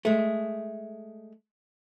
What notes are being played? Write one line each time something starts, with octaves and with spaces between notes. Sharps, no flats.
G#3 A3